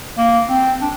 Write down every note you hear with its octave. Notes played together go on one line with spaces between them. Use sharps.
A#3
C4
D4